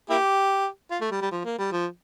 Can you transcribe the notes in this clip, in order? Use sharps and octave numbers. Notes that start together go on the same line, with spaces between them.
A#3 E4 G4
F4
A3
G3
G3
F3
A#3
G3
F3